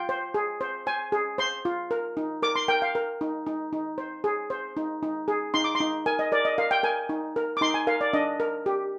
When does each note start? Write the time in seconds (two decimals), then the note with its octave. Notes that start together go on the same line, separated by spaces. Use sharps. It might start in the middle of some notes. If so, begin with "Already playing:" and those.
Already playing: F4 G5
0.09 C5
0.34 G#4
0.61 C5
0.87 C5 G#5
1.12 G#4
1.38 C5 C6
1.65 F4
1.91 A#4
2.17 D#4
2.42 A#4 D6
2.56 C6
2.68 A#4 G5
2.82 F5
2.95 A#4
3.21 D#4
3.46 D#4
3.73 D#4
3.98 C5
4.24 G#4
4.50 C5
4.77 D#4
5.03 D#4
5.28 G#4
5.54 D#4 C6
5.64 D6
5.75 C6
5.80 D#4
6.06 A#4 G#5
6.19 D#5
6.32 A#4 D5
6.45 D#5
6.58 A#4 F5
6.71 G5
6.83 A#4 G#5
7.09 D#4
7.36 A#4
7.57 D6
7.61 D#4 C6
7.74 G#5
7.87 A#4 F5
8.01 D5
8.13 D4 D#5
8.40 A#4
8.66 G4